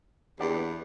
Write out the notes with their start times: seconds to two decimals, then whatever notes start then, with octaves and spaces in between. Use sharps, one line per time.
0.40 E2 D4 G4 D5
0.54 B3